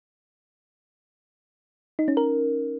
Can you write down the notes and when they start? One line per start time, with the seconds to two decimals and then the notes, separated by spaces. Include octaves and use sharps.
1.99 D#4
2.08 C#4
2.17 A#4